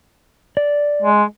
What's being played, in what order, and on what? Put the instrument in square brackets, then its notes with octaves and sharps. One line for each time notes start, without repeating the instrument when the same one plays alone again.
[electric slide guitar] D5
[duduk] G#3